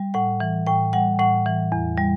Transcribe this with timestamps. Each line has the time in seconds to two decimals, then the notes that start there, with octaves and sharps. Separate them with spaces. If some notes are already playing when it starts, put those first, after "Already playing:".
Already playing: G3
0.14 A2 F#5
0.40 E3
0.67 A2 G5
0.93 G3 F#5
1.19 A2 F#5
1.46 E3
1.72 E2
1.97 G3